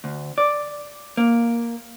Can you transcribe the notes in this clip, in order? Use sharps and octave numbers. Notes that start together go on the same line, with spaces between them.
D2
D5
A#3